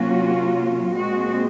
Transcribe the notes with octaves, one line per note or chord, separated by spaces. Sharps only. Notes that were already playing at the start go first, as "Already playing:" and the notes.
Already playing: C3 F#3 A#3 C#4 F4 F#4
A#2 G#3 C4 F#4